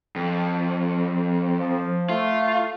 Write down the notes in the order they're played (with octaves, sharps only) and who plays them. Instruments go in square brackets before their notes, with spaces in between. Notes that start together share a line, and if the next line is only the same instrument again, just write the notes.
[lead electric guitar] F2
[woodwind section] F3
[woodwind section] A3 [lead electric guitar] F4